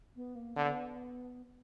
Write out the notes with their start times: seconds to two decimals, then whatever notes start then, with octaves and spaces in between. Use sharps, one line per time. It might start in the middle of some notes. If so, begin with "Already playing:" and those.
0.16 B3
0.35 A#3
0.56 D3 B3